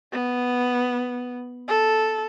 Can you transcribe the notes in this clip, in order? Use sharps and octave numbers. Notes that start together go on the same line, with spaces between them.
B3
A4